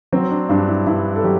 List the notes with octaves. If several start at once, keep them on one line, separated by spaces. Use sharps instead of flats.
F#3 C4
D4
G2 D4
E4
G2 E4
A4
F#3 G4